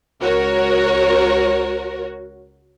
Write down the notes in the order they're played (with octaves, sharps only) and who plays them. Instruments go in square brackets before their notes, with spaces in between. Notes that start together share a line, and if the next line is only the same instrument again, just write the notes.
[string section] C#2 F#4 A#4 C#5